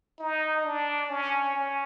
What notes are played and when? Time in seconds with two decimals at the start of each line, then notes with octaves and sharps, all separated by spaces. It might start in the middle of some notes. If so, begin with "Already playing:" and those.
0.19 D#4
0.64 D4
1.09 C#4
1.55 C#4